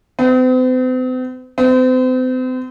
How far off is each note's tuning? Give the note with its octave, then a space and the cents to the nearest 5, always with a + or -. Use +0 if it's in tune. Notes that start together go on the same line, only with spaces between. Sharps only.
C4 -45
C4 -40